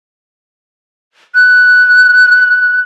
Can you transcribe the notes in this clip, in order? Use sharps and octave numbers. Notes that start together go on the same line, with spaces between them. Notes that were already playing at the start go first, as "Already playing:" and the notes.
F#6